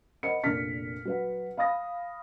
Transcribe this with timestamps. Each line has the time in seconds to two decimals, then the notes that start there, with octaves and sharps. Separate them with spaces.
0.23 A#4 C5 D#5 F#5 B5 C#7
0.44 F1 A#2 D4 A#4 F6 B6
1.05 F#3 B4 F#5
1.57 F5 B5 D#6 A#6